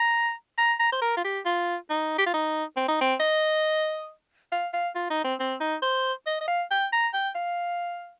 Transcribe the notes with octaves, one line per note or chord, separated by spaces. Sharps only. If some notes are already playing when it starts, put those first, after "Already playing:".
Already playing: A#5
A#5
A#5
C5
A#4
F4
G4
F4
D#4
G4
F4
D#4
C4
D#4
C4
D#5
F5
F5
F4
D#4
C4
C4
D#4
C5
D#5
D#5
F5
G5
A#5
G5
F5